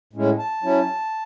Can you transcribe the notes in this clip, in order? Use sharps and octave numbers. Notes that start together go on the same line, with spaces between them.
A2 G#3 C#4 E4
A5
F#3 C#4 E4